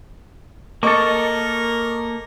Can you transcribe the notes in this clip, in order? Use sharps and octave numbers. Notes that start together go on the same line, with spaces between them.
A#3 A4 A#4 D#5 C#6 D6